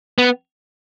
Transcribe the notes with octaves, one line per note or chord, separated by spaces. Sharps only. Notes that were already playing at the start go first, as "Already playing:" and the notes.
B3